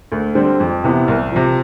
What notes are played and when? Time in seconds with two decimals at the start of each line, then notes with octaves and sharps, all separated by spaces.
0.12 D2
0.35 D3 G3 C4
0.60 F2
0.84 C3 E3 B3 E4
1.08 C2
1.32 C3 F3